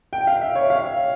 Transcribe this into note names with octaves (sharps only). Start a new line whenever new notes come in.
G5
F5
E5
C#5
F5